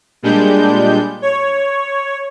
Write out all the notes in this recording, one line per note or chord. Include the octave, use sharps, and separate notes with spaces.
A#2 G3 G#3 D4 G6
C#5